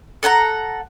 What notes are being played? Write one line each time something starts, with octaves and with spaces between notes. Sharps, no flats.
A4 F#5 G#5 A#5